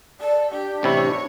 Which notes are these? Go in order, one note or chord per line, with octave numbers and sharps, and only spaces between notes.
A4 D5
D4 G4
A1 C3 E4 C#5